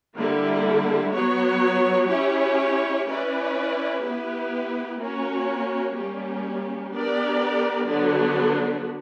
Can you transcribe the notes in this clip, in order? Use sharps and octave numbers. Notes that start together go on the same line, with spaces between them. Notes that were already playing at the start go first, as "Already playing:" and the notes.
D3 G3 A#3 E4
F#3 B3 F#4 C#5
C#4 E4 G4 C#5
C#4 E4 B4 D5
B3 E4 G4 B4
A#3 C#4 F#4 A#4 C#5
G3 A#3 C#4 G4
B3 D4 G4 A#4 D5
D3 F#3 B3 D4